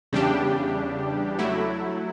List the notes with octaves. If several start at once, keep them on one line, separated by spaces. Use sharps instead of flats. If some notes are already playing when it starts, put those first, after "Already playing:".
E2 C#3 G3 D4 G4
F#3 A3 E4